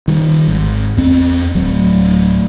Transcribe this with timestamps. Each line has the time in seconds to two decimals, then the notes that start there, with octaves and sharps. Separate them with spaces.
0.08 D#3 F3 G3
0.48 G#1
0.97 E2 C4
1.55 D1 F#3 A3